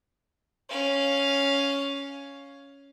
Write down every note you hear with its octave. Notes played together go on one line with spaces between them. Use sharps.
C#4 F5